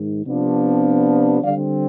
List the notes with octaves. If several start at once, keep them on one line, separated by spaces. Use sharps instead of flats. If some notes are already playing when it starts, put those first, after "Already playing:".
Already playing: G#2 D#3
C3 F3 B3 D4
D3 G3 C4 D5 F5